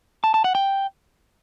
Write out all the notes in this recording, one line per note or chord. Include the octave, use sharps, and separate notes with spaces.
A5
A5
F#5
G5